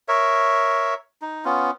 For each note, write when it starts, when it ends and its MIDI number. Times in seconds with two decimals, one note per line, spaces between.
0.08 0.94 70
0.08 0.94 73
0.08 0.94 76
1.22 1.45 63
1.45 1.71 59
1.45 1.71 61
1.45 1.71 65